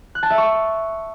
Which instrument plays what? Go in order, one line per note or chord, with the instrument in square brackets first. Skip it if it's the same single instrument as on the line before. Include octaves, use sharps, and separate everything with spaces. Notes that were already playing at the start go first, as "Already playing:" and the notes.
[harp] F#6
A5
E5
C#6